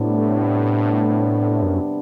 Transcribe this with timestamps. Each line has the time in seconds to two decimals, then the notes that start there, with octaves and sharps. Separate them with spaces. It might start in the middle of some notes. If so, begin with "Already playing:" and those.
Already playing: A2 C3 G3 B3 D4
1.63 F#2